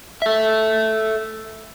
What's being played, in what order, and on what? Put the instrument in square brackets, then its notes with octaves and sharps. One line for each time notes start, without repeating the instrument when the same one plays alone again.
[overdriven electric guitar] A4 E5